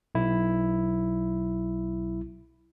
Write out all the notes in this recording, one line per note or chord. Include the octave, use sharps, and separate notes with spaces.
B1 E4